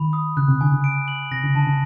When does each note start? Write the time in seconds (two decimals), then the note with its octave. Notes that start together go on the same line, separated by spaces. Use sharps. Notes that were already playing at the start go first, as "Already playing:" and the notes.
Already playing: D#3 B5
0.13 D#6
0.37 C#3 F#6
0.48 C3
0.61 D3 G#5
0.72 C#3
0.84 D7
1.08 F#7
1.32 C3 A#6
1.44 C#3
1.55 D3 A5
1.67 C#3